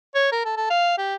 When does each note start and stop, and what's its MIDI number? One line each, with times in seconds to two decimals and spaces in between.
0.15 0.29 73
0.32 0.43 70
0.45 0.54 69
0.56 0.70 69
0.70 0.96 77
0.98 1.15 67